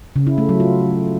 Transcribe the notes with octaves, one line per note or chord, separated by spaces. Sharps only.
C#3
E4
A3
F#3
F4